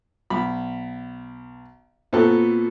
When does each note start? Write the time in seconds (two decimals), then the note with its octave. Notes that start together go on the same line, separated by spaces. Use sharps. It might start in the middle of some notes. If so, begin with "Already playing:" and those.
0.30 B1 B5
2.13 A#2 B3 C4 F#4 A4